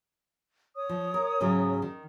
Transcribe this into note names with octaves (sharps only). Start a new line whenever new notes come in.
C#5 D#6
F3
A#4
G#2 C#3 F#3
D#3